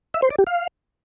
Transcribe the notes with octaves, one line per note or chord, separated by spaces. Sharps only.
E5
C5
D5
G4
F5